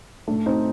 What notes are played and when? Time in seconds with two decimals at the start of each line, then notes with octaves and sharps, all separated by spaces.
0.28 A3 D4
0.31 A2
0.46 C4 D#4